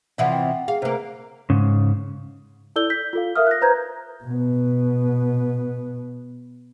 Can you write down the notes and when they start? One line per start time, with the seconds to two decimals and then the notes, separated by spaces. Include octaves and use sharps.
0.18 C3 E3 F3 D5 E5 F#5
0.32 D#5 G5
0.68 G#4 F5
0.82 C3 A#3 B4 C5
1.50 G#2 C#3
2.76 E4 A4 D5 E6 G6 G7
2.90 G6 B6
3.13 F4 A4 F5
3.36 A#4 E5 F5 D#6 F6
3.47 F#6 A#6
3.62 B4 C5 A#5 G6 G#6
4.24 B2 B3